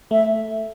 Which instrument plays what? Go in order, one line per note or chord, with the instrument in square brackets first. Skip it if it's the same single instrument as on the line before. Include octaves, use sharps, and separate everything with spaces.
[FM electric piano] A3 [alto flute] E5